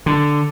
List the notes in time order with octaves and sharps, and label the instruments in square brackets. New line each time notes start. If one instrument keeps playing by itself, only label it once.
[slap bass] D3